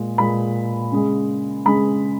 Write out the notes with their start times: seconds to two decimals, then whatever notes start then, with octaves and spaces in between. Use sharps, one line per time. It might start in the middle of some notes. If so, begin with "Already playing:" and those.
Already playing: A#2 G#3
0.18 A#2 G#3 B5
0.92 C#3 G#3
1.65 C#3 G#3 B5